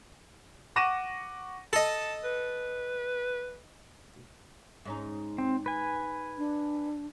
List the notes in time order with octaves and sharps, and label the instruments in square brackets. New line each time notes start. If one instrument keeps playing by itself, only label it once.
[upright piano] F#5 C#6 D6 A#6 D#7 E7
[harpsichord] A4 D#5 [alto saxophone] A5
[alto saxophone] B4
[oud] G#2 C#4 D#4
[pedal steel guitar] C4
B4 G#5
[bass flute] D4